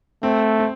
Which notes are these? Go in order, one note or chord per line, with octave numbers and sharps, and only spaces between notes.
A3 C4
C4